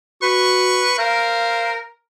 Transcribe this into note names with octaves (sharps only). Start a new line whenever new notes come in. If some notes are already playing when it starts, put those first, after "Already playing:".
F#4 B4 C#6
A#4 C5 F5